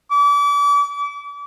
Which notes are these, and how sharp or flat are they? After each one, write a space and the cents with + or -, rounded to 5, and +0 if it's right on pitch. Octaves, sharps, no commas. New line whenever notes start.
D6 -35